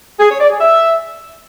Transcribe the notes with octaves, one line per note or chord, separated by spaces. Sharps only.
G#4
C#5
D5
G#4
E5